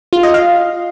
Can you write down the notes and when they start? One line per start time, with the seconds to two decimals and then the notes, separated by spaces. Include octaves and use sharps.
0.13 F4
0.23 D#5
0.34 F5